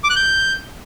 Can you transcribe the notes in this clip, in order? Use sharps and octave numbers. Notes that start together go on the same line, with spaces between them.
D6
F#6
G6